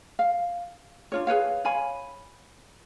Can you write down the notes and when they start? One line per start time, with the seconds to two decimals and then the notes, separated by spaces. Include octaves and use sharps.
0.19 F5
1.12 D4 F4 C#5
1.27 G#4 B4 C#5 F5
1.65 C#5 F5 G#5 B5